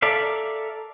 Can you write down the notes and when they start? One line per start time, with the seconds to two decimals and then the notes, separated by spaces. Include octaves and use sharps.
0.02 A4 A#4 D5 E5 F5